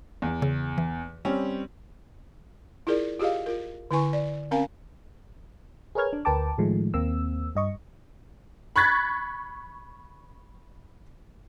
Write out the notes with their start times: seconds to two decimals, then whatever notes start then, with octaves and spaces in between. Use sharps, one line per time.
0.22 E2
0.42 C#3
0.78 E3
1.25 G3 C4 C#4
2.87 E4 F4 G#4 A#4 D5
3.19 F4 G4 G#4 D#5 F5
3.46 F4 A#4
3.91 D3 E4 B4 G#5 C#6
4.13 D5
4.51 C4 C#4 A#4 F5 G#5
5.95 G#4 A#4 B4 C#5 F6 G#6
6.13 D4
6.25 D2 A#4 B4 G5 A5 D6
6.58 A2 D#3 F3 G#3 A3
6.94 D#2 A#3 C4 E6
7.55 G2 D#5 C#6
8.76 B5 C#6 F#6 G#6 A6 B6